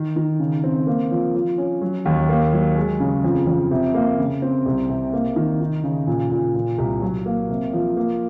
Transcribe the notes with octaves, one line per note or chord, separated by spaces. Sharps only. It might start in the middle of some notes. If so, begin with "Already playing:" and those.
Already playing: D#3
D#3
C#3
C4
A#3
F3
F3
C#4
F#3
D#2
A#3
F#3
G#3
C#3
F2
F2
C3
A#3
C#3
C4
C2
C3
A#3
D#3
D#4
C#3
A#2
A#2
A#2
C2
F#3
A#3
C3
F3
A#3